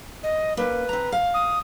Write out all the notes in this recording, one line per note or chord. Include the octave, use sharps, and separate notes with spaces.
D#5
A#3 C#4 B4
C4 A#5
F5
D#6